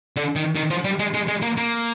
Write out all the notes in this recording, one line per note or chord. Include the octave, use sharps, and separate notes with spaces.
D3
D#3
D#3
F3
G3
G#3
G#3
G#3
A#3
A#3